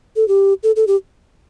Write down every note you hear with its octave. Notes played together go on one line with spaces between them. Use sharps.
A4
G4
A4
A4
G4